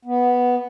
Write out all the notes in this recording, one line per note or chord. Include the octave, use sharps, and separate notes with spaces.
B3